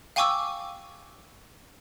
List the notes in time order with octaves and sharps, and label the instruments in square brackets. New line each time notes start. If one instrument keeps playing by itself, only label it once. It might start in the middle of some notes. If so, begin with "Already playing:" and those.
[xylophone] F5 G5 G#5 C#6 D6 E6